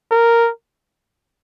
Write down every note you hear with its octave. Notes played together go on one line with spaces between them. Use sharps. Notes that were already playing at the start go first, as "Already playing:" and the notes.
A#4